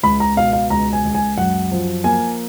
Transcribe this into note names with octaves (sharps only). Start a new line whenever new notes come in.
C#2 B5
A#5
B2 F5
F5
C#2 A#5
G#5
C#2
G#5
F#2 F#5
F3
A#3 G#5